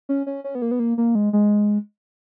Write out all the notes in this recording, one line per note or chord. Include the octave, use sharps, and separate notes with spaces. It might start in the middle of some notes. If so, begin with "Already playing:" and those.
C#4
C#4
C#4
B3
A#3
B3
A#3
A#3
G#3
G#3